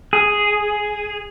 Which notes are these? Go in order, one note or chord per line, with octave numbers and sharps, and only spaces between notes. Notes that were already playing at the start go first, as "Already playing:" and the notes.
G#4